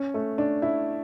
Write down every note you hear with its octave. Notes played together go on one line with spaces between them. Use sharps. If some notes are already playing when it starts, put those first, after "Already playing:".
Already playing: C#4
A3
D4
E4